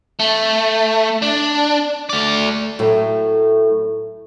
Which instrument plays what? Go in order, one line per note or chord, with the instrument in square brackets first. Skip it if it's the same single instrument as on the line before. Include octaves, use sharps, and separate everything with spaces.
[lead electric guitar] A3
D4
A3 D5
[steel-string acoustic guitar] A2 F#3 A3